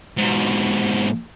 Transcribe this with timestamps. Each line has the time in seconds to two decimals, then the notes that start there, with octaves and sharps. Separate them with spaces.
0.17 G#2 B2